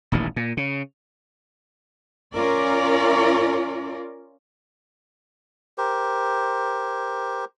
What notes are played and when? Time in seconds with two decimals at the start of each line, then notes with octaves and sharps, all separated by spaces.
0.12 D#1 A1 A#2 D#3
0.36 A#2
0.57 C#3
2.35 C#4 F4 A#4 D5
5.78 G4 A#4 C5